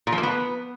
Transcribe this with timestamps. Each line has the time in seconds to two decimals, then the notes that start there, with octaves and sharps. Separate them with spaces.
0.07 A#2
0.12 F3
0.18 A#3
0.23 B3